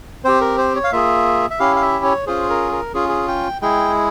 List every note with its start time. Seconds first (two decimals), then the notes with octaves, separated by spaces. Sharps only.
0.25 C4 G4 C5
0.41 A#4
0.58 C5
0.75 C#5
0.84 F5
0.92 A#3 F4 G#4 E5
1.50 E5
1.59 C#4 E4 G4 F5
1.76 F5
1.82 E5
2.05 C#5
2.27 C#4 F4 G#4 C5
2.50 A#4
2.72 A#4
2.94 C#4 F4 G#4
3.09 G#4
3.28 G5
3.62 G#3 E4 G#4 G5